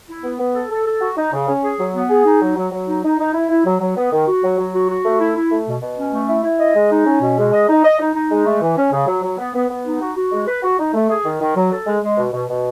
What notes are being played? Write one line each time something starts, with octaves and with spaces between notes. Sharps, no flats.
E4
B3
B3
A4
A4
A4
F#4
D#4
C#3
C#4
G#4
F#3
B3
G#4
D#4
F#3
F#3
F#3
D#4
D#4
D#4
E4
E4
F#3
F#3
B3
D#3
F#4
F#3
F#3
F#4
F#4
A3
E4
E4
A3
B2
B2
C#4
A3
E4
E4
D#5
G#3
D#4
C#4
B2
G#3
D#5
D#4
D#5
D#4
D#4
G#3
A3
E3
C#4
C#3
F#3
F#3
B3
B3
B3
D#4
F#4
F#4
G#3
B4
F#4
D#4
A3
G#4
D#3
D#3
F#3
A4
G#3
G#3
B2
B2
B2